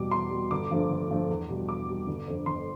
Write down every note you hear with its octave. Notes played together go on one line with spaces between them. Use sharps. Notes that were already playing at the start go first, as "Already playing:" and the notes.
Already playing: E2 B2 G3 D6
E2 C6
B2 G3
G1 D6
G2 F3 A3
G1
G2 F3 A3
E2
B2 G3
E2 D6
B2 G3
G1
F2 D3
G1 C6